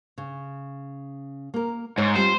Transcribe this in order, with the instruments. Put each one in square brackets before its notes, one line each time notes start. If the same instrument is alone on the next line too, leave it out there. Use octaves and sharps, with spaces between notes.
[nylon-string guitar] C#3
A#3 A#4
[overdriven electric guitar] G#2 [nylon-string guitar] C#5
[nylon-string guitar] G3 C4 F4 [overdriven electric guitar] C5